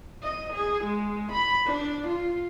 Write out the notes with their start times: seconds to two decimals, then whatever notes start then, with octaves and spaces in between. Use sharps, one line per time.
0.23 D#5
0.53 G#4
0.84 G#3
1.32 B5
1.65 D4
2.07 F4